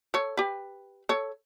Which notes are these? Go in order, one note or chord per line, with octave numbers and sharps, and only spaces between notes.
A4 C#5
G4 B4
A4 C#5